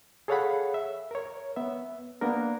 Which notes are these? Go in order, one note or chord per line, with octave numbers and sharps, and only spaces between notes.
G#4 A4 C#5 F5 F#5 B5
E5
A#4 C#5
B3 E5
A#3 B3 D4 A#4